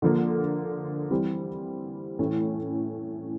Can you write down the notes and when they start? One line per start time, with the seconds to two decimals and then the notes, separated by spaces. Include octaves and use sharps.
0.02 D3 F3 A#3
1.11 E3 G3 C4
2.19 A2 E3 A3 C#4